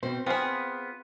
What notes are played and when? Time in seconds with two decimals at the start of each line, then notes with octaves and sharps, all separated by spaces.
0.03 B2 C4 C5
0.27 B3 C4 F4 G#4 F5